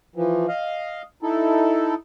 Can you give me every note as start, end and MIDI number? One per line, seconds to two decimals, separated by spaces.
0.16 0.46 52
0.16 0.46 53
0.48 1.02 75
0.48 1.02 77
1.22 1.94 63
1.22 1.94 64
1.22 1.94 69